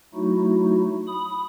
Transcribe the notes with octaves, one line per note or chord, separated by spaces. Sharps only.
F#3 A3 D#4 E4 F#4
B5 D#6